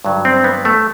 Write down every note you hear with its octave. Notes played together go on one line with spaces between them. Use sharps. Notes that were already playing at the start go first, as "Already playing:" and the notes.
G2 D3 F#3
C4
B3
A3